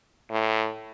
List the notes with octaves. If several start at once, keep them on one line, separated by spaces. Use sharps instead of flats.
A2